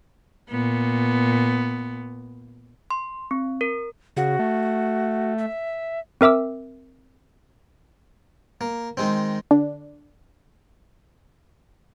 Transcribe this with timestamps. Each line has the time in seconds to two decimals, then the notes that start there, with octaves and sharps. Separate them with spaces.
0.50 A#2 B3
2.90 C6
3.31 C4
3.61 A#4
4.17 C#3 F#4
4.39 A3
5.38 E5
6.21 C4 A#4 E5 D6 E6
8.61 A#3
8.97 D#3 G#3 C4
9.51 D3 D4